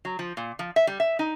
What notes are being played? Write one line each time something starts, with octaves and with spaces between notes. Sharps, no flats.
F#3
F3
A#2
F3
E5
G3
E5
D#4